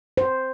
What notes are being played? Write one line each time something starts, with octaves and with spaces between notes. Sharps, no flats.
C5